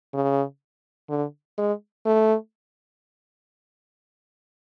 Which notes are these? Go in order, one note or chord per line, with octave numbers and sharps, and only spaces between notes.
C#3
D3
G#3
A3